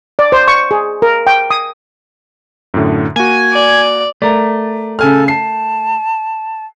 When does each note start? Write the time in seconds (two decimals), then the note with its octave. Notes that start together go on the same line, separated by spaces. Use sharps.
0.19 D5
0.32 C5
0.48 C#6
0.71 G#4
1.02 A#4
1.27 G5
1.51 D#6
2.74 F#2 A2 D3
3.16 A#3 F#4 G#5
3.53 D5
4.22 A3 A#4 D5
4.99 C#3 A4 G#5 F6
5.28 A5 C7